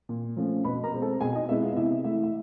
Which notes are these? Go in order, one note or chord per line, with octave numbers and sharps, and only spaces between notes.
A#2
F3 A3 C#4
B2 B4 B5
A#4 A#5
G#3 C4
A4 A5
B2 G#4 G#5
D#4 D#5
G#3 B3 E4 E5
F4 F5
D#5
C3 E4 E5
E3 A3 E4 E5
E5